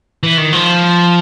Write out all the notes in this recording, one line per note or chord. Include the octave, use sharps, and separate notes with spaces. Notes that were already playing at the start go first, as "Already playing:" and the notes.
E3
D#3
F3